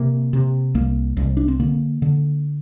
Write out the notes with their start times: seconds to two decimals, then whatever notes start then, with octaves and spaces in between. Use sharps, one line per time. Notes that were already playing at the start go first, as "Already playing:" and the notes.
Already playing: C3 A#3
0.33 C3
0.75 C2 A#3
1.17 C2
1.37 D4
1.48 C4
1.60 D3 A#3
2.02 D3